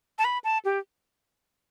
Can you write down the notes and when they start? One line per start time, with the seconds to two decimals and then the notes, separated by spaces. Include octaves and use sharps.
0.19 A5
0.24 B5
0.44 A5
0.65 G4